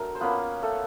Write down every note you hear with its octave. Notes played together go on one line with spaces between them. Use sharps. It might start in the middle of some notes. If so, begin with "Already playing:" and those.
Already playing: F#3 A3 D4 A#4
C5
A#3 B3 C#4 F4 B4
A3 A4